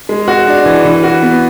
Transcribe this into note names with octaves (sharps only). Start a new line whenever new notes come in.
G#3
F#4
D4
E3
E3
F#4
B3